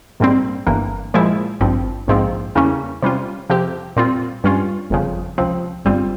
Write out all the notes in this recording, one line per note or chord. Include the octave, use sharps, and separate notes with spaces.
A#1 G#2 G3 C4
G1 G2 E3 A#3
A#2 F3 G#3 E4
G#1 G2 F3 C4
A#1 G#2 F3 C4
E2 C#3 G3 A#3 C#4
C3 G3 C#4 F4
F2 C3 F3 C4 G4
A#2 G3 C4 F4
G2 G3 C#4 F4
G1 F2 C#3 F3
C#2 C3 F3 C4
G1 G2 G3 C4 F4